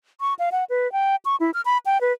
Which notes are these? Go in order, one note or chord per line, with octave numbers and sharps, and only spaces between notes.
C#6
F5
F#5
B4
G5
C#6
E4
F6
B5
G5
B4